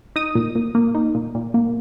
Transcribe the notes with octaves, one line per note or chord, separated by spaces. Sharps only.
D#4 D#6
A#2
A#2
A#3
D#4
A#2
A#2
A#3